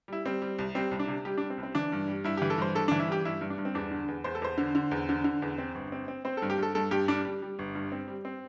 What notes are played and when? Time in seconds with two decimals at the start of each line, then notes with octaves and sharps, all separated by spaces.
0.08 G3 E4
0.25 G3 C4
0.42 G3
0.59 C2
0.75 G3 C4
0.91 C2
0.99 D4
1.08 C3
1.25 G3 G4
1.38 D4
1.41 G3
1.50 C4
1.58 C2
1.63 C4
1.75 E3 D4
1.92 G2
2.08 G3
2.24 G2 E4
2.37 G4
2.42 E3
2.50 A4
2.58 G2 C5
2.75 G2 A4
2.88 E3 D4
3.00 E4
3.08 G3 G4
3.25 G2 E4
3.41 G2
3.50 D4
3.58 G2
3.65 C4
3.75 E2 D4
3.91 D3
4.08 E2
4.24 E2 C5
4.35 A4
4.42 E2 C5
4.58 D3
4.75 D3
4.91 E2
5.09 D3
5.24 D3
5.42 E2
5.58 C4
5.75 G1
5.92 C4
6.08 C4
6.25 C4 C5
6.37 A4
6.42 G2
6.50 G4
6.58 G2 A4
6.75 G2 A4
6.91 G2 G4
7.08 G3 D4
7.25 G3
7.42 G3
7.59 G1
7.75 G2
7.92 C4
8.08 G3
8.25 C4